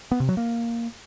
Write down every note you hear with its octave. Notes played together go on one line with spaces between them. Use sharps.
B3
C3
F#3
A#3